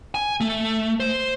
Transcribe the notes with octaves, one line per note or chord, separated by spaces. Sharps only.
G#5
A3
C5